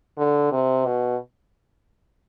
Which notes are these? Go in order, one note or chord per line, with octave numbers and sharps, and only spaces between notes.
D3
C3
B2